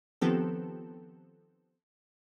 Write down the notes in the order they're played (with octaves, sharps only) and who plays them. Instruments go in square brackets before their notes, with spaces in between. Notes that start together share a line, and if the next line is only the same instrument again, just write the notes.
[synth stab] D#3 F3 B3 C4 G4 A4